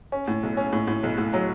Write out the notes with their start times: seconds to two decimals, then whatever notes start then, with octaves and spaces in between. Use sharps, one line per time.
0.12 C#4
0.28 A2
0.43 B1
0.57 C#4
0.73 A2
0.87 A2
1.03 B1
1.18 A2
1.33 F#3